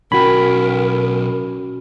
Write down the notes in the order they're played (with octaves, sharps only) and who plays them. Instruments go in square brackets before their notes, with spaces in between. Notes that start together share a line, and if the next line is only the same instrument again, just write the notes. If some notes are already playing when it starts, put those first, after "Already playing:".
[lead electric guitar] B1 G5 [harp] C#4 F#4 [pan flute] A#4 [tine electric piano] B5